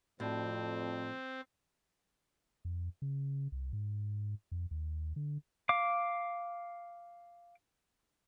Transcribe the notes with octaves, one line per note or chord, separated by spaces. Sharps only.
F2 A2 C4 F#4 D5 A5
F2
C#3
C2
G#2
F2
D#2
D3
F5 D6